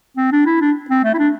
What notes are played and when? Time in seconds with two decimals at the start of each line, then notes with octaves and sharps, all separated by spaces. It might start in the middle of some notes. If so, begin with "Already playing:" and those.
0.17 C4
0.32 D4
0.46 E4
0.61 D4
0.90 C4
1.04 A3
1.14 E4
1.19 D4